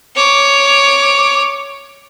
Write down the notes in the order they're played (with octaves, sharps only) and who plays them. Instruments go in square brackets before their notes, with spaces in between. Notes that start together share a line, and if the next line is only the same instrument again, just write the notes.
[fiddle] C#5 D6